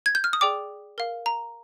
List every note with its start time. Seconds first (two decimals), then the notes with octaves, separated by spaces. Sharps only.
0.06 G#6
0.15 G6
0.24 F6
0.33 D#6
0.41 G#4 D5 G5 D6
0.98 A#4 F5
1.26 A#5